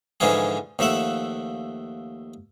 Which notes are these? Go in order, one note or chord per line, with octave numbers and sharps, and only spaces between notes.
G#2 D3 E3 F3 F4 G#4
D#2 F3 A3 E5 F#5